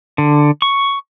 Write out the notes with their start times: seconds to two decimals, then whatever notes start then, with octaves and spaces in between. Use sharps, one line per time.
0.18 D3
0.62 C#6